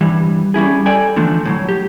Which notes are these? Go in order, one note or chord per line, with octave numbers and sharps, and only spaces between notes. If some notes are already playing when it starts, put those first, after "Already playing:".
G2 E3 G3
G3 C#4 E4 G#4
A4 D5 G5 G#5
D3 E3 F3 A3
A2 F3 F#3
G4